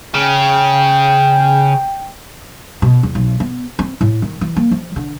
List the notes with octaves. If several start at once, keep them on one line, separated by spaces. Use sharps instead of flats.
C#3 G5
B2
E2
B1
B3
C4
A2
D#3
E3
A#3
F3
D3